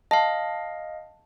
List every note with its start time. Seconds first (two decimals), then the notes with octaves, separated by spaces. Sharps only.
0.11 D#5 F5 A5